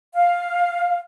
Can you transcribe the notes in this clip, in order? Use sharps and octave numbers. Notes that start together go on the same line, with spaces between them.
F5